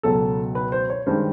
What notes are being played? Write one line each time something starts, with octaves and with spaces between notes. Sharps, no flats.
C#2 B2 F#3 A4
B4
C5
C#5
G2 D#3 G#3 C5